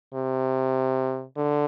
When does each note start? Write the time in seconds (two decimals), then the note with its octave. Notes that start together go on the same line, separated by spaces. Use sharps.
0.14 C3
1.36 D3